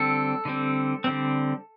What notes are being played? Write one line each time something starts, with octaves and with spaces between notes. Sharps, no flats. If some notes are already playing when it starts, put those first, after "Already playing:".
Already playing: D3 G3 C4 A4
D3 G3 C4
D3 G3 C4